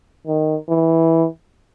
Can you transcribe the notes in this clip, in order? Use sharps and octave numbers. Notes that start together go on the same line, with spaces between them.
D#3
E3